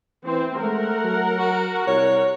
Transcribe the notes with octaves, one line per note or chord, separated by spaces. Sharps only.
E3 C4
G#3 A3 A#4 F#5
F#3
F#4
C2 C#5